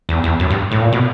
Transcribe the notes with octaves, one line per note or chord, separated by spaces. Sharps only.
E2
E2
F#2
G2
A2
A#2
B2